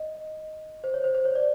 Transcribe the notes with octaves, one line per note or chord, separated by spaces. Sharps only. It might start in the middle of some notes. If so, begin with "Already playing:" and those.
Already playing: D#5
C5
C#5
C5
C5
C#5
D5